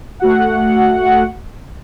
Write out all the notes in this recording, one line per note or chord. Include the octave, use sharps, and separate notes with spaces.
A3 F#4 F#5